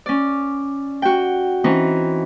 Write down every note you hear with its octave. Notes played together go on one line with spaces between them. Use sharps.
C#4 D5
F#4 G5
E3 C4 C#4 D#4